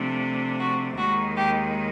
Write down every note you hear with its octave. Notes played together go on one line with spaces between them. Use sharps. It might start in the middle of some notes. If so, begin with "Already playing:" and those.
Already playing: C3 F3 A3 D4
F#4
D#2 D#3 G#3 F#4
G4